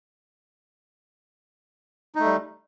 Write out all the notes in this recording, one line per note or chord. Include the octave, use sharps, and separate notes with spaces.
G3 A3 D#4